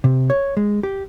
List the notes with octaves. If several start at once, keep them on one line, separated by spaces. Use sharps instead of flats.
C3
C#5
G#3
G4